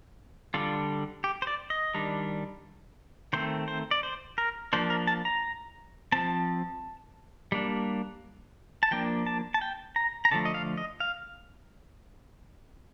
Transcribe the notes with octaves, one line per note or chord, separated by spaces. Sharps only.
D3 G3 D4 F4
G4
C5
D5
D#5
D#3 G3 D4
D#3 A3 C4 C5
C5
D5
C5
A#4
F3 A#3 D4 C5
A#4
A5
A#5
F3 C4 A5
G3 A#3 D4
A5
F3 A#3 D4 G5
A5
A5
G5
A#5
A#5
D3 F3 A3 A5
D#5
F5
D#5
F5